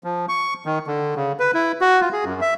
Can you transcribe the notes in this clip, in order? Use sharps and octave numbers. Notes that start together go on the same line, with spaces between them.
F3
C#6
D#3
D3
C#3
B4
E4
F#4
F4
G#4
F#2
E5